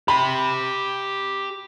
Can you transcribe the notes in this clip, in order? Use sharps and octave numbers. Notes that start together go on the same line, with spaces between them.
G4 B5 C6